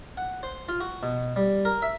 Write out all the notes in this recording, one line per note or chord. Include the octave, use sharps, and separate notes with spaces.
F#5
C5
F4
F#4
B2
G3
A#4
E5